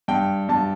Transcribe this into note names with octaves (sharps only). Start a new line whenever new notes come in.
G2 G5
G2 A5